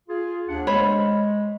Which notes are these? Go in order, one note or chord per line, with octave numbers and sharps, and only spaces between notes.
F4 G#4
D#2 D4 F#5
G#3 C5 C#5 B5